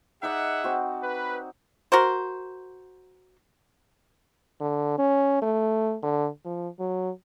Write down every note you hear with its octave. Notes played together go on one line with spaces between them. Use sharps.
D#4 G#4 D5 E5 F#5
C4 F#4
B4
F#4 A#4 C5
D3
C#4
A3
D3
F3
F#3